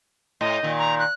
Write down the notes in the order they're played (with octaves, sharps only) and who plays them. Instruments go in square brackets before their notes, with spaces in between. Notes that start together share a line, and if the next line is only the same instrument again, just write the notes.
[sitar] A2 [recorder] D#5
[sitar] A#2 D#3
[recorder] A#5
F#6